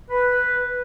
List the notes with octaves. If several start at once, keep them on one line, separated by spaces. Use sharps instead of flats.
B4